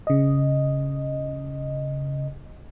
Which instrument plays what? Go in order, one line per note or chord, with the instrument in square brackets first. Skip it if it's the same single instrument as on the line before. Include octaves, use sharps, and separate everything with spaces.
[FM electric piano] C#3 D#5